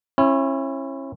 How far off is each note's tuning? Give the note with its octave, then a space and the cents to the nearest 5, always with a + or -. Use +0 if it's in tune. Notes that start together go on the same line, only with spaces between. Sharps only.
C#4 -35 E4 +20